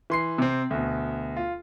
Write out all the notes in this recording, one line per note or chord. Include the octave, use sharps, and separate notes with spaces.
E3 C6 C7
C3 C4
D2 B2
F4